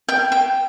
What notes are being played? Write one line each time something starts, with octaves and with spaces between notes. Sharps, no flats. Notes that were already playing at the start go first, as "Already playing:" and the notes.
G5
G5